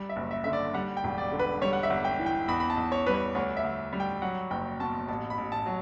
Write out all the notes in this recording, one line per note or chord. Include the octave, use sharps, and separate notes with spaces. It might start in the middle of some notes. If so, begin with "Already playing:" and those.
Already playing: G3
E5
F#1
E5
D3 E5
D5
G3 F#5
G5
E1
D5
D3
B4
G3 C#5
F#5
E5
G1
G5
E3
G5
E2 B5
B5
A5
E2
C#5
G3 B4
C#5
D2 C#5
E5
D2
G3
G5
F#3 F#5
F#1 G5
B2 A5
A1 A5
B5
A1
A5
F#3